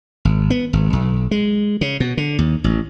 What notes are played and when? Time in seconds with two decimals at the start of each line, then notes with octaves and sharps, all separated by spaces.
0.25 G#1
0.50 B3
0.73 G#1
0.93 B1
1.31 G#3
1.81 C#3
2.00 B2
2.17 D3
2.39 D#2
2.64 A1